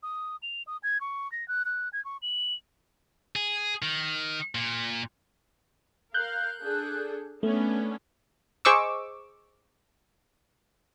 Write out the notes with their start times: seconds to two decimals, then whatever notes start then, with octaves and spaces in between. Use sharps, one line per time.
0.03 D#6
0.43 F7
0.67 D#6
0.83 G#6
1.01 C#6
1.32 A#6
1.48 F#6
1.65 F#6
1.93 G#6
2.05 C#6
2.22 F#7
3.36 G#4
3.82 D#3
4.55 A#2
6.14 A#4 F5 F#6 G6
6.61 D4 G#4 A4
7.43 A3 B3 C#4 D4
8.65 G#4 C5 D#5 C#6 D6 E6